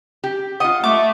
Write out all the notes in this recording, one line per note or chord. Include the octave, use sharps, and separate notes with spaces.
G4
F4 D#5 F#5
A3 D6